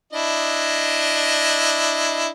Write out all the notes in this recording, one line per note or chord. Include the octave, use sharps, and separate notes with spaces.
D4 E4 D#5